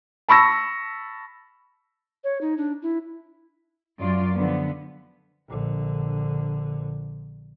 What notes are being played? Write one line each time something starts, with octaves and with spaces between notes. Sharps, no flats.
A5 B5 C#6 E6 A#6
C#5
D#4
D4
E4
F#2 F4 D5
D3 F3 B3
A#1 D3